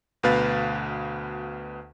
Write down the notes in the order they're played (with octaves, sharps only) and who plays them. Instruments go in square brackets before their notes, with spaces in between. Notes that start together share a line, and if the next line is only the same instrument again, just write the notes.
[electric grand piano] D2 B2 B4 F5 A6